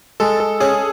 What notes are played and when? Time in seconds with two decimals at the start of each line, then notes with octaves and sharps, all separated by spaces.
0.20 G#3 A4
0.40 A4
0.60 C#4 G#4